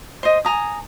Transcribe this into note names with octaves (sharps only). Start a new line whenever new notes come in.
C5 D#5
G#5 A#5 D#6